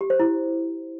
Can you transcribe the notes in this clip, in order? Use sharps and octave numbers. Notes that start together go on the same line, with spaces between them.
G4
C5
E4